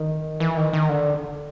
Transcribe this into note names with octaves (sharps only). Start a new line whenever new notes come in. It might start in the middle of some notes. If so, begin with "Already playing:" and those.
Already playing: D#3
E3
D#3
D#3
D3